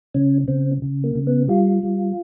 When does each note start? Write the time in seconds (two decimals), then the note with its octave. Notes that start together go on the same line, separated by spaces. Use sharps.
0.14 C#3 C#4
0.48 C#3 C4
0.82 C#3
1.04 A#3
1.15 C#3
1.27 B3
1.48 G3 F4
1.83 G3